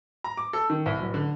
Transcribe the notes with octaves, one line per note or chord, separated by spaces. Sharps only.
A#5
D6
A4
D#3
C2
D1
D3